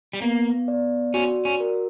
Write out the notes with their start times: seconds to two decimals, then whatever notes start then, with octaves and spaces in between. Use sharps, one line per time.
0.13 G3
0.22 A#3 B3
0.68 D5
1.14 C#4 F#4
1.45 C#4
1.60 A#4